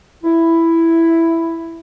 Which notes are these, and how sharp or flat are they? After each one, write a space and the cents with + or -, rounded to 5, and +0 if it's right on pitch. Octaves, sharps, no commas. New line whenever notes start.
E4 +5